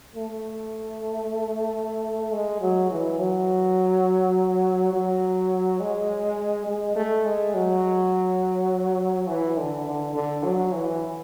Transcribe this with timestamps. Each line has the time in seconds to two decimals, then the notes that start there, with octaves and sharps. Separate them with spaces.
0.15 A3
2.33 G#3
2.61 F#3
2.91 E3
3.19 F#3
4.93 F#3
5.80 G#3
6.67 G#3
6.96 A3
7.25 G#3
7.54 F#3
9.27 E3
9.57 D3
9.86 D3
10.15 D3
10.43 F#3
10.72 E3